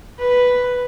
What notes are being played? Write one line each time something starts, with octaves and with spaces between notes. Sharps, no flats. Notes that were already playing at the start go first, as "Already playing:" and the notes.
B4